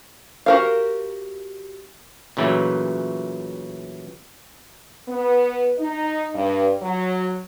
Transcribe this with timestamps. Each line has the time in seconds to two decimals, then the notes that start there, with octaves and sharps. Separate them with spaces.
0.46 F#4 G4 A#4 C5 F5
2.37 A#2 C#3 E3 F#3 A3
5.08 B3
5.78 D#4
6.34 G2
6.82 F#3